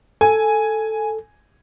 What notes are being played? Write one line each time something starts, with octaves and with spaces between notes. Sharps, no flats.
A4 G#5